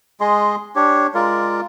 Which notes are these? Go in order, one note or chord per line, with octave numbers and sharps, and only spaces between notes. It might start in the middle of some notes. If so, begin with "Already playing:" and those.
G#3 G#4 D#5 C6
D4 G4 C#5
G#3 F4 A#4 D5